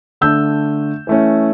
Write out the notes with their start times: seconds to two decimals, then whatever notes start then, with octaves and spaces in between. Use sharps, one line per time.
0.21 D3 A3 D4 E6 G6
1.07 E3 A3 C#4